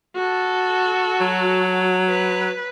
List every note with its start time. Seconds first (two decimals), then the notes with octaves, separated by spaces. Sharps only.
0.15 F#4 A4
1.21 F#3
2.09 B4